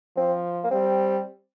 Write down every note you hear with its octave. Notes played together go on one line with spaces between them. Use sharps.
F3 C4
A#3
G3 C4